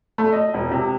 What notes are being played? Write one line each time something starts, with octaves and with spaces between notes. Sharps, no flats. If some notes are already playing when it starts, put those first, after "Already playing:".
A3
D#5
E1
C3